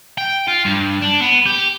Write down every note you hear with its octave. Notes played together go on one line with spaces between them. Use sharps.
G5
F4
G2
D4
B3
G4